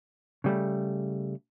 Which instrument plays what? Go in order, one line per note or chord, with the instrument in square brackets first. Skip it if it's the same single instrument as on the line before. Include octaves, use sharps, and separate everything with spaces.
[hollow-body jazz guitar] C#3 G3 A3